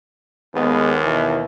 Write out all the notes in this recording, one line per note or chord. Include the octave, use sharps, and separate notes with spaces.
D#2 G#3 B3
B2 E3